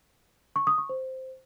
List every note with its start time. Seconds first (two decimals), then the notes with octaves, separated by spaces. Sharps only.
0.56 C#6
0.67 D#6
0.78 C#6
0.89 C5